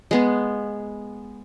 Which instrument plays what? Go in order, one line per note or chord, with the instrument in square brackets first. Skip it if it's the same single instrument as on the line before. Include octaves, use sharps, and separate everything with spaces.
[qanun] G#3 B3 G#4